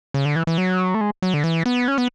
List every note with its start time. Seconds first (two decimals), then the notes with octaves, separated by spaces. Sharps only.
0.14 C#3
0.25 D3
0.36 E3
0.47 E3
0.58 F#3
0.94 A3
1.01 G#3
1.22 F#3
1.34 D3
1.44 E3
1.66 B3
1.88 C#4
1.98 B3